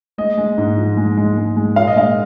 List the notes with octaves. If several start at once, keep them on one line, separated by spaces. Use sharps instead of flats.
G#3 D#5
G#3
G#2
F3
G#3
G#3
G#3
G#3
A#2 F5
D#5
G#3 F5